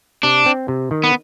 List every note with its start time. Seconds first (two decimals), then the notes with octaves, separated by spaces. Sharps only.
0.23 C3 D4
0.46 C4
0.68 C3
0.91 D#3
1.03 B3